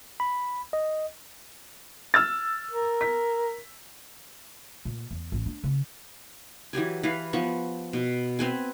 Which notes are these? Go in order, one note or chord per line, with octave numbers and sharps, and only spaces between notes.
B5
D#5
E6 F6 A6
A#4
B6
A#2
E2
A1
D4
C#3
E3 F#3 G4 G#5
E3 B4 F5
F3 B3 C#6
B2
B3 C4 B4 G#5